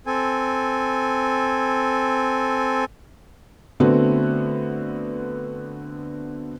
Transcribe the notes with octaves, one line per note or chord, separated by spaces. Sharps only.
C4 A4 G#5
D3 A3 B3 C4 F#4